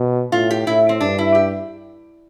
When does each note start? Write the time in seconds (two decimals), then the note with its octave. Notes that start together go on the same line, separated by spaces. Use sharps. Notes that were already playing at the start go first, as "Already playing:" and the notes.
Already playing: B2
0.32 A2 F4
0.50 G4
0.67 A2 E4
0.89 C4
1.00 G2 D4
1.18 E4
1.35 G4